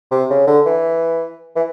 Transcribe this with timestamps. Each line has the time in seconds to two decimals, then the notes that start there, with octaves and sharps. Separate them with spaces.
0.11 C3
0.30 C#3
0.47 D3
0.66 E3
1.56 E3